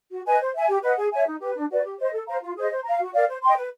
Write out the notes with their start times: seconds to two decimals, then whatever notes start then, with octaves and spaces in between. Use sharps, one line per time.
0.11 F#4
0.25 B4 D#5 G#5
0.40 C5
0.54 E5 G#5
0.68 G4
0.82 B4 D#5 F#5
0.97 G#4
1.11 C#5 E5 G#5
1.27 D#4
1.40 G4 B4
1.55 D4
1.70 F#4 B4 D5
1.84 G4
1.99 C5 D#5
2.12 A4
2.27 C5 F5 A#5
2.41 F4
2.56 G#4 C5 D#5
2.71 C5
2.84 F5 A#5
2.99 F#4
3.13 A#4 D5 F5
3.27 C5
3.42 D#5 G5 C6
3.56 B4